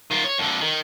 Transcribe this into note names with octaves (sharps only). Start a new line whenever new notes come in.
D#3 F4
C#5
F2 D3
D#3